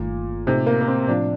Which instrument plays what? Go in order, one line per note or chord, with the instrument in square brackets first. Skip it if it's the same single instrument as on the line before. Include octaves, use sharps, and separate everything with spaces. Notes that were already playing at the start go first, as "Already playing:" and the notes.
Already playing: [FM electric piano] G1 G2 D#3 A3 [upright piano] A#2
[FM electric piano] A2 A3 D#4 G4 [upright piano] C3
[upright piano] A#3
A#3
C4
[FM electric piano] A2 F3 C4 F4 [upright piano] D4